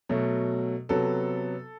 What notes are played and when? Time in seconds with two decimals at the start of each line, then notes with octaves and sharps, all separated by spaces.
0.09 B2 F#3 A3
0.89 C3 F#3 B3 A4